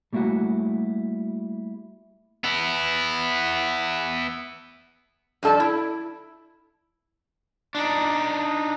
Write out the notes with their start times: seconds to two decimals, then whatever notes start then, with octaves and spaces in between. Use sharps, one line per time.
0.13 G3 A3 A#3 E4 F#4 F#5
2.44 B3 E4
5.43 G2 F3 A4 D5 A5
5.60 E4
7.75 D4 D#4